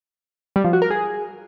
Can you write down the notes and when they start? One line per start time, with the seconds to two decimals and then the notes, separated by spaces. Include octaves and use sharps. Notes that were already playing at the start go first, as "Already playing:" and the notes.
0.56 G3
0.64 F3
0.73 F#4
0.82 A#4
0.90 G#4